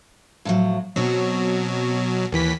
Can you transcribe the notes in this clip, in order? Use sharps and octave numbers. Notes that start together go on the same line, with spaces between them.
A2 F3 F#3
B2 F#3 C4 C#5
D#2 E3 B6